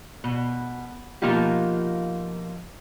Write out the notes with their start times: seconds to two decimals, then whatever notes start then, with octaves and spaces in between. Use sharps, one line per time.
0.24 B2
1.22 B2 F3 A#3 D#4 F4 G4